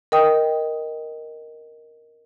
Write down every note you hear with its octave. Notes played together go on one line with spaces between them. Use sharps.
A#4 D#5 G5 D#6